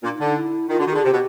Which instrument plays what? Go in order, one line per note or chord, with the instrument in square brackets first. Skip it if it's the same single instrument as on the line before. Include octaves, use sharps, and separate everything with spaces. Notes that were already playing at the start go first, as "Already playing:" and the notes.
[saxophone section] A#2 [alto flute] D4
[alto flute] D#4
[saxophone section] D3
[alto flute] D#4
E4
[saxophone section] D#3 [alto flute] F4
[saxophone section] D3
[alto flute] F#4
[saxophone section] D#3
[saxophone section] D3 [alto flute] G#4
[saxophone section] C3 [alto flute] G4
[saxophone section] B2